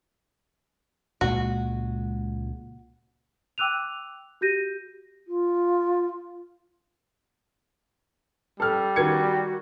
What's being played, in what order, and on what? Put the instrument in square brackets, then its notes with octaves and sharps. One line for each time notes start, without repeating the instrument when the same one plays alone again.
[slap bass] C#2 A#2 G#3 [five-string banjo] F#4
[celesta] G5 D6 E6 F#6 D#7 F7
F#4 G4 G6 A#6 D#7
[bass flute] F4
[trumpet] G3 [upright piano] A4 F6
[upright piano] D#3 G#6 C#7 [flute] F#4